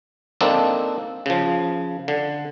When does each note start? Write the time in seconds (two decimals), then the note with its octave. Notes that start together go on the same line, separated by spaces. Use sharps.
0.41 A#3 C4 D4 D#4 A4
1.26 C#3 F3
2.08 D3